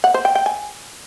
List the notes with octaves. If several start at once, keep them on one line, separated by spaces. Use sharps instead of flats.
F#5
C5
G5
G5
G#5